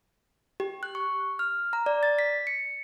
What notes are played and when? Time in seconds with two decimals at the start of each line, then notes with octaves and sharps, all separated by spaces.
0.60 G4
0.83 F#6
0.95 C#6
1.39 F6
1.73 A#5
1.86 D5
2.03 A6
2.19 B6
2.47 C#7